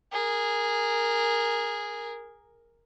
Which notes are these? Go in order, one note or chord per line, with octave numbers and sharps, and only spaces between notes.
G#4 A#4